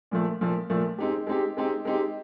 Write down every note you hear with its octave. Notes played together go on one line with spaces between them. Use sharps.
A#2 F3 A3
A#2 F3 A3
A#2 F3 A3
G#3 C4 D#4 G4
G#3 C4 D#4 G4
G#3 C4 D#4 G4
G#3 C4 D#4 G4